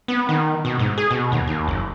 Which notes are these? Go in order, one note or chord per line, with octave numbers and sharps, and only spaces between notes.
B3
D#3
B2
G#2
G#4
B2
D#2
D#2
F#1